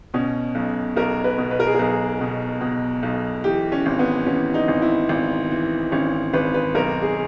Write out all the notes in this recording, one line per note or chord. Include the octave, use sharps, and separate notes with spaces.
B2 C#4
B1
B1 A#4
B4
B2
B4
A#4
G#4
B1 A#4
B2
B2
B1
E3 G4
C#4
G#1
B3
E3 C#4
D#4
G#1
E4
G#1
E3
G#1 C#4
G#1 B4
B4
B1 A#4
G#4